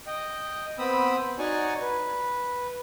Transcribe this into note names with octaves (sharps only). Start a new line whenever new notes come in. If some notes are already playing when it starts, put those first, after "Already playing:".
D#5 G5
B3 C4 G5 B5 D#6 E6
D#4 F#4 C#5 D5 G#5 C#6
B4